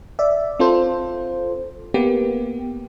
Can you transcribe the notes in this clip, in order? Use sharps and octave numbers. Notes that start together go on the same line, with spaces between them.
D5 E5
C4 F4 A4 C5
A#3 B3 G4